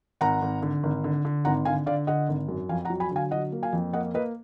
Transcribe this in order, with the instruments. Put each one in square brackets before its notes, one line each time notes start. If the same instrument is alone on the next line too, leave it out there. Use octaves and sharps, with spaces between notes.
[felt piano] G#1 F#5 A#5
G#1
D3
G#1
D3
D3
G#1 F#5 A#5
D3 F5 G#5
D3 D5 F5
D3 D#5 F#5
G#1
F#2
F2 F5 G#5
F#5 A#5
F#3
G#5 B5
D3
F5 G#5
F#3 D#5 F#5
A#3
F5 G#5
F2
A#3 D#5 F#5
A#3 B4 D#5